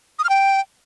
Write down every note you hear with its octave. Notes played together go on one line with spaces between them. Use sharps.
D#6
F6
G5